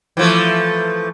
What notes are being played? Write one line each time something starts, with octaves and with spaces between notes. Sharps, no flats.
E3 F3 A3